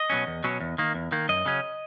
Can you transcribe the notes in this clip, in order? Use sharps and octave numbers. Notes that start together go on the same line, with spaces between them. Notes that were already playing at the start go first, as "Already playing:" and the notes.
Already playing: D#5
B2 F#3 C#4
E2
B2 F#3 C#4
E2
D#3 A#3
E2
D#3 A#3
F#2 D#5
C#3 F#3 C#4